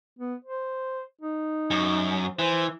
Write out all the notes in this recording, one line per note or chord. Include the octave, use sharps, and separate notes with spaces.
B3
C5
D#4
F#2
E3 C5